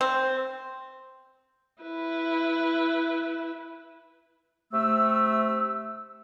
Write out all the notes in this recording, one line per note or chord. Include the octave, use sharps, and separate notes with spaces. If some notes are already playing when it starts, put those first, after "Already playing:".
C4
E4 B4
C3 A3 E6